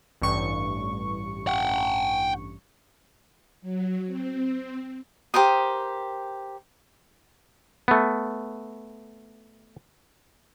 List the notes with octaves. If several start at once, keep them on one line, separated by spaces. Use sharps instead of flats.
A1 G2 C#6
F#5 G5
F#3
C4
G4 A#4 C5 D#6
A3 B3